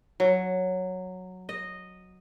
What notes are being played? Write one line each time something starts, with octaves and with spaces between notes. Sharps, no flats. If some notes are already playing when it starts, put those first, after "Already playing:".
F#3
D#5